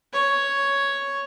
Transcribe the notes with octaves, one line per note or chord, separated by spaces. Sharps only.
C#5